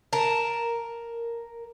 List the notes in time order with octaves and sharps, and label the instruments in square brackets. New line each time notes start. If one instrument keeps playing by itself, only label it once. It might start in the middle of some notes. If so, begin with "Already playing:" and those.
[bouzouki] A#4 A5